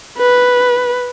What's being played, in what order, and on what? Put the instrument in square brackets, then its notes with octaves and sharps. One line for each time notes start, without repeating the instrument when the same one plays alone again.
[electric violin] B4